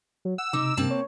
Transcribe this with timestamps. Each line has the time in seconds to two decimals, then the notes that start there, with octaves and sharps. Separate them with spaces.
0.25 F#3
0.38 F#5 E6
0.53 C3 D#4 D6
0.77 G2 A#3 C4 A5
0.90 C#5